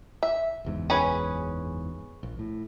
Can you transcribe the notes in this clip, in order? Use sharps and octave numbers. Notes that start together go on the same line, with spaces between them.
E5
F#1 E2 G#2
C#4 G#4 B4
A#1
A2